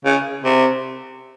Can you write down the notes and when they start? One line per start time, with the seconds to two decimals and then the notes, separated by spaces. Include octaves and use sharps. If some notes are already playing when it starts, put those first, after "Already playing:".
0.05 C#3
0.44 C3